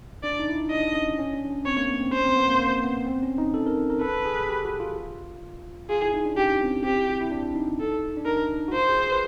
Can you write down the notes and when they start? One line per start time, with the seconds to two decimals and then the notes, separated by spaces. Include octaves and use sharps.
0.23 D4 D5
0.39 D#4
0.49 E4
0.56 D#4
0.70 D4 D#5
0.94 C#4
1.18 C#4
1.34 D4
1.50 C#4
1.66 C4 C#5
1.77 A#3
1.89 B3
2.01 C4
2.13 C#4 C5
2.24 C4
2.36 B3
2.48 A#3
2.59 A#3
2.84 B3
3.06 C4
3.23 C#4
3.38 D#4
3.54 A4
3.66 A#4
3.90 A#4
4.01 A4 B4
4.25 G#4
4.49 G4
4.65 F#4
4.80 F4
5.90 F4 G#4
6.02 E4
6.14 D#4
6.25 D4
6.37 C#4 G4
6.61 C4
6.84 C4 G4
6.96 E4
7.08 F#4
7.21 E4
7.31 D4
7.56 D#4
7.80 A4
8.17 D4
8.26 D#4 A#4
8.68 F#4
8.73 F4 C5
8.89 G#4
9.12 B4